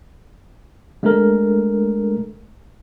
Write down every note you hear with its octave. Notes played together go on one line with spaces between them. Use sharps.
G#3 A3 D4 A4 A#4